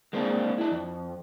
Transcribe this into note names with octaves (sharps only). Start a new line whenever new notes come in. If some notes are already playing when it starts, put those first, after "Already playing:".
G#3 A#3 C4 D4
D4 E4
F2